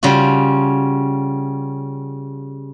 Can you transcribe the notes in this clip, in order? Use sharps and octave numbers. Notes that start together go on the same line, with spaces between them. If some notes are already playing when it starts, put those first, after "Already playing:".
C#3 G3 F4 F#4